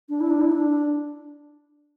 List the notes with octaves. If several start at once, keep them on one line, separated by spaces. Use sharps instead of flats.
D4
E4
D4
E4
D4